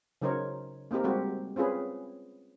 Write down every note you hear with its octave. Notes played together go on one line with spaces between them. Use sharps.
C#3 F#3 D#4 A#4 C5 C#5
A#3 C4 D#4 G4 A#4
G3 G#3 C4 F#4 G4
C4 C#4 F4 G#4 B4